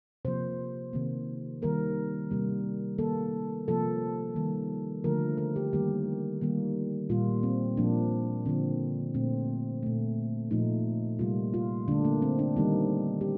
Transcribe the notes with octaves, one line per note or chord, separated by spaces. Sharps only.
C3 F3 A#3 C5
C3 D#3 A#3
D#3 G3 A#3 A#4
C3 G3 A#3
D#3 A#3 A4
C3 F3 A#3 A4
D#3 G3 A#3
D3 F3 A3 A#4
A#4
G4
D#3 G3 A#3 G4
D#3 G3 A#3
A#2 G3 A#3 F4
C4
A#2 F3 A#3 D4
D3 F3 A#3 C4
A#2 A3 C4
A#2 A3
A#2 F3 A3 D#4
C3 G3 A#3 F4
F4
D3 A3 D4
A#3
C4
D4
D#3 G3 A#3 D#4
G4